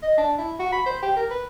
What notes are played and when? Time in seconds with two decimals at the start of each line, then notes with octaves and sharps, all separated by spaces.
0.02 D#5
0.18 D4
0.38 E4
0.59 F#4
0.72 B5
0.86 C5
1.03 G4
1.17 A#4
1.30 B4